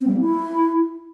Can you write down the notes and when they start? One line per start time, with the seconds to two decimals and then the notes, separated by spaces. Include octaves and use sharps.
0.01 C4
0.07 G3
0.14 A#3
0.20 E4